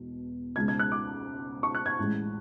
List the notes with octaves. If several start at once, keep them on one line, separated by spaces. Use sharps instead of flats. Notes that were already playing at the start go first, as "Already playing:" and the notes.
Already playing: E1 E2 B2
C#2 B2 G#3 G#6
G#6
F#6
D6
C#6
F#6
G#6
A1 A2 G#3